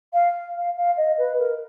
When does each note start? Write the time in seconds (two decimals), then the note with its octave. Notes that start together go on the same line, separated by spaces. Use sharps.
0.13 F5
0.55 F5
0.76 F5
0.97 D#5
1.18 B4
1.39 A#4